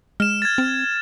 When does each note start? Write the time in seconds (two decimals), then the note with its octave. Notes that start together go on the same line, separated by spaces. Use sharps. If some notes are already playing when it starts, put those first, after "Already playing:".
0.20 G#3 F6 E7
0.42 G#6 A6
0.58 C4